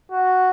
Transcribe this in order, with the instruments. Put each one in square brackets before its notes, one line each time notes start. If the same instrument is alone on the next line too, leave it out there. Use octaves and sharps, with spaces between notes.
[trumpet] F#4